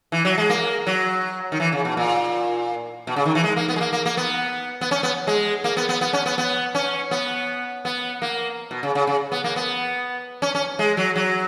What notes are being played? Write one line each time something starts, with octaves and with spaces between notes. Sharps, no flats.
E3
F#3
G#3
A#3
F#3
D#3
E3
C#3
B2
A#2
B2
C#3
D#3
E3
G#3
A#3
B3
G#3
A#3
A#3
A#3
B3
B3
C#4
B3
G#3
A#3
B3
B3
B3
C#4
B3
B3
C#4
B3
B3
A#3
B2
C#3
C#3
C#3
B3
A#3
B3
C#4
C#4
G#3
F#3
F#3